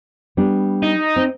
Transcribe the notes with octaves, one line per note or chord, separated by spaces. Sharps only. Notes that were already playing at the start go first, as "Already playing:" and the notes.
G3 B3 D4
D#4
C4